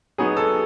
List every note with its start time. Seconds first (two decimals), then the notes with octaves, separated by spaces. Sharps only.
0.18 F#3 B3 D#4 G#4
0.37 A4